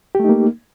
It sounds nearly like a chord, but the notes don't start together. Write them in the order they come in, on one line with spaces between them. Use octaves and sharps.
G4 A3 D#4 A#3